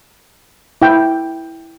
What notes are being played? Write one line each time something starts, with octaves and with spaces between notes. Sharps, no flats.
E4 G5